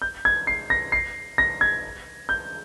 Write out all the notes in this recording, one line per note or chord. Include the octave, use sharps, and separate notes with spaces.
G6
G#6
C7
A#6
C7
A#6
G#6
G6